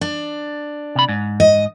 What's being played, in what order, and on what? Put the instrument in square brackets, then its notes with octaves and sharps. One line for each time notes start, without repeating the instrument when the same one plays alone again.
[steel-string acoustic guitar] D4
[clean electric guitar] C3 B5
G#2
[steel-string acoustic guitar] D#5